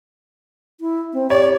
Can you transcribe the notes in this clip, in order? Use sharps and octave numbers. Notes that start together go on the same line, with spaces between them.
E4
C4
G4 C#5 D5